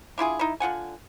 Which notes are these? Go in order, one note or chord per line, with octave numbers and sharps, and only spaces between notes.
D4 E4 F4 G#4
D#4 E4
D3 F4 F#5 G#5